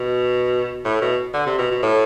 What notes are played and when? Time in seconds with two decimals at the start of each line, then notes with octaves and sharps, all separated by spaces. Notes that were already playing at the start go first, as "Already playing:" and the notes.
Already playing: B2
0.85 A2
1.01 B2
1.34 D3
1.46 C3
1.58 B2
1.71 B2
1.83 A2